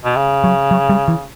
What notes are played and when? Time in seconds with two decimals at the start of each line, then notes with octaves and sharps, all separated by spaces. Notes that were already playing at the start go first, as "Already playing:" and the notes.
0.04 B2
0.16 C#3
0.44 F#3
0.71 F#3
0.89 G3
1.08 E3